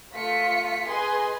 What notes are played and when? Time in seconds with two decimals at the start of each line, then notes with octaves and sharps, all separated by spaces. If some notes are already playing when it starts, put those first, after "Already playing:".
0.14 A3 F4 B6 C#7
0.88 G#4 B4 D#5 G#5 C6